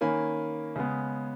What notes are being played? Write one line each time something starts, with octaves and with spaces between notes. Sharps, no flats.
D#3 A#3 C#4 G#5 B5
C#3 G#3 B3